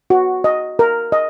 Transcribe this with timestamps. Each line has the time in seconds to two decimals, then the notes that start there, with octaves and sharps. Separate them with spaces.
0.10 F#4
0.44 D#5
0.79 A#4
1.12 D#5